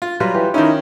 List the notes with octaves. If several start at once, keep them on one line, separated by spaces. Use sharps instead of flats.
F4
F#3 G3 F4 B4
E3 G4
D#3 C#4 D#4 E4